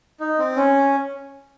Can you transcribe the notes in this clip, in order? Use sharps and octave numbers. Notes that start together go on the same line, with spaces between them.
D#4
C4
C#4